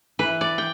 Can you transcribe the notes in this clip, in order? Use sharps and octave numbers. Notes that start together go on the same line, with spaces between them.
E3 B4
D5
G5